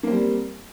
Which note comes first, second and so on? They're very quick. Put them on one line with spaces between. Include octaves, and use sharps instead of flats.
A#3 C4 G3